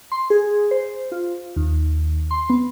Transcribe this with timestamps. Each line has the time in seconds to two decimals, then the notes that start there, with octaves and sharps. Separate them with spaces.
0.12 C6
0.30 G#4
0.71 C5
1.12 F4
1.56 D#2
2.31 C6
2.50 B3